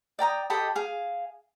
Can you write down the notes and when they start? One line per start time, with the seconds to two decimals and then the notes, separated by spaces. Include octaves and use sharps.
0.19 D5 G5 A#5 D#6
0.50 G4 A4 D#5 B5
0.75 G#4 F5